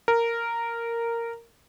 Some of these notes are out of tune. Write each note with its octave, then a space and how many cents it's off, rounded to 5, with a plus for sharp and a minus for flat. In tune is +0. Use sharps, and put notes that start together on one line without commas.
A#4 -10